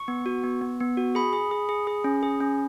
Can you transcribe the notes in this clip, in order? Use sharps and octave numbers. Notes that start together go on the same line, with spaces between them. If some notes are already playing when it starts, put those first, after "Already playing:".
Already playing: C#6
B3
F#4
B3
B3
B3
F#4
G#4 B5
G#4
G#4
G#4
G#4
C#4
G#4
C#4